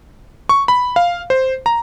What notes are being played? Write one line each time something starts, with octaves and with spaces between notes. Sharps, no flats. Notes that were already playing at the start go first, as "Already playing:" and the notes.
C#6
B5
F5
C5
A#5